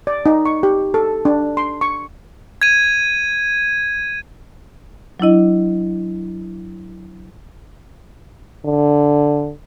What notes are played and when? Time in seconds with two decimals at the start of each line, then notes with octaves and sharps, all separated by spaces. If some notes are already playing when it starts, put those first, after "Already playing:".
0.07 D5
0.26 D#4
0.46 C#6
0.63 G4
0.94 A4
1.25 D4
1.57 C6
1.81 C#6
2.62 G#6 D#7
5.20 F#3 D4 E4 D#5
8.65 D3